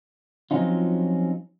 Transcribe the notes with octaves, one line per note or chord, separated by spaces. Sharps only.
F3 F#3 C4 C#4 D#4 F4